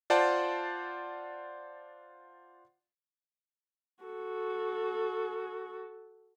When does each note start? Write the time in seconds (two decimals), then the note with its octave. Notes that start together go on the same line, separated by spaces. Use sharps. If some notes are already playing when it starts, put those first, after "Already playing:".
0.10 F4 C5 D5 F#5 A5
4.04 F#4 A4